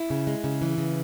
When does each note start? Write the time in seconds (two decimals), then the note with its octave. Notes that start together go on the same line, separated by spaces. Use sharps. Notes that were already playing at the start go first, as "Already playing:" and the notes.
Already playing: E4
0.10 C#3
0.27 G#3
0.44 C#3
0.62 E3
0.78 C#3